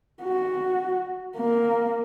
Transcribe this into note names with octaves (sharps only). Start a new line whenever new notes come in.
F#4
A#3